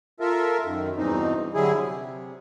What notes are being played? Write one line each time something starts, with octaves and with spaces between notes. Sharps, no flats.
F4 A4 A#4 E5
F#2 D#3
E2 G2 B2 E3 C4 D#4
D3 F#3 G3 E4 G#4
C3